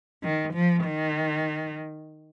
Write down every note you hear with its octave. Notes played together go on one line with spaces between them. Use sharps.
D#3
F3
D#3